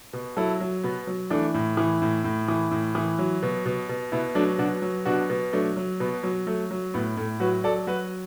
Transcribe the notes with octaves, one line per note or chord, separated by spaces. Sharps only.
B2
F#3 E4 A4
F#3
B2 B3
F#3
E3 A3 D4
A2
E3
A2
A2
E3
A2
E3
F#3
B2
B2
B2
B2 B3 E4
F#3 A3 D4
B2 D4 F#4
F#3
B2 D4 F#4
B2
F#3 A3 D4
F#3
B2 B3
F#3
F#3 A3
F#3
A2 B3
A2 A3
F#3 F#4 B4
F#3 A4 D5
F#3 F#4 B4